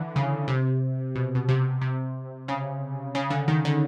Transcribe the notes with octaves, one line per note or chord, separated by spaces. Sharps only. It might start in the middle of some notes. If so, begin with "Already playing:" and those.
Already playing: D3 E3
C#3
C3
B2
B2
C3
C3
C#3
C#3
D3
D#3
D3